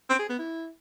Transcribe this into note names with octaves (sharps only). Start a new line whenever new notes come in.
C4
G#4
B3
E4